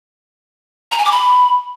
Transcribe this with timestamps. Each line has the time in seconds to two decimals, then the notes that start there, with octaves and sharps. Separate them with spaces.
0.92 A#5
0.98 G#5
1.05 D6
1.12 B5